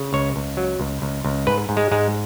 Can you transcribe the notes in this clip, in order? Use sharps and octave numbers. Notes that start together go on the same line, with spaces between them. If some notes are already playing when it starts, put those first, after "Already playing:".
Already playing: C#3
C#2 C#5
C#2
F#3
C#2
C#2
C#2
G#2 B4
G#2
G#3
G#2 G#3